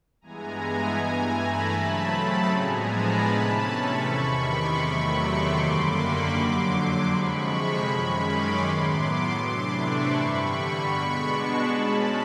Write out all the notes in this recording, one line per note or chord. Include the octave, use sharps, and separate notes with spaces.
G2 E3 G#3 B3 G#5 A#5
G2 E3 A3 G#5 A#5
A5 B5
C#3 F#3 A3 C4
A2 F3 G#3 B3 D4 G#5 A#5
A5 B5
C3 E3 A3 C#4
B5 C#6
E2 C3 D#3 B5 C#6
C6 D6
E2 C3 D#3 F#3 A3 B5 C#6
C6 D6
F#2 D3 G3 A#3
B5 C#6
F2 D3 F#3 C6 D6
F2 C3 F3 G#3 B5 C#6
F#2 D#3 G#3 C#4 B5 C#6
C6 D6
A2 F#3 B3 C6 D6
C3 E3 A3 D4
B5 C#6
G2 D3 G3 B5 C#6
B5 C#6
B2 G#3 B3 D4
A5 B5
B2 G#3 C#4 A5 B5